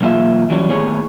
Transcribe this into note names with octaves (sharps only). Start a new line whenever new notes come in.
B1 E2 A#3 F4 E5
E3 F#3 G3 C#4
D#2 A2 B3 G#4 C#5